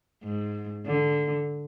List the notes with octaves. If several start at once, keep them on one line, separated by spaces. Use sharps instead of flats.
G#2
D3